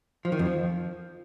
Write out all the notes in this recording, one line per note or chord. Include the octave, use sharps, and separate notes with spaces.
F3
D#3
F2
F3